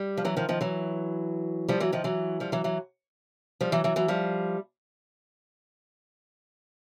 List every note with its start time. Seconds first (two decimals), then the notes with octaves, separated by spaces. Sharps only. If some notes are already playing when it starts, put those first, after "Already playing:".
Already playing: G3
0.17 F3
0.25 E3 F#3
0.37 D#3 F3
0.49 D#3 F3
0.61 E3 F#3
1.68 F3 G3
1.80 E3 F#3
1.92 D#3 F3
2.04 E3 F#3
2.40 F3 G3
2.52 E3 F#3
2.64 E3 F#3
3.61 F3 G3
3.72 E3 F#3
3.84 E3 F#3
3.96 E3 F#3
4.08 F3 G3